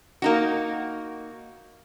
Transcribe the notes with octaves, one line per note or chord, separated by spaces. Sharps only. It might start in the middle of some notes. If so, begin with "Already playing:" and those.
A#3 D#4 F#4